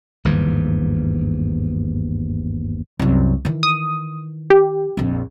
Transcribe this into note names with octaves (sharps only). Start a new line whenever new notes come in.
G1 D#2 G#2 E3
C2 F#2
D#3 E3
D#6
G4
A#1 F2